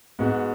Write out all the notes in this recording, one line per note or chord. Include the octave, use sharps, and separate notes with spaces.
G#2 G#3 B3 F#4